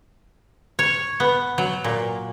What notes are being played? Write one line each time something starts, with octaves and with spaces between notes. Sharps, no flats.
C#5
B3
F#3
A#2